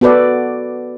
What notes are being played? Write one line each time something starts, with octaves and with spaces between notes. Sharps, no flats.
B3 F#4 A4 B4 D5